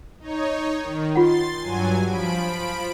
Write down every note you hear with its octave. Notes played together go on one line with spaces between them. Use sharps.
D#4 C#5
D#3
F4 F#5 C6 A6
G2 F#3 G#5
F3 B5 D7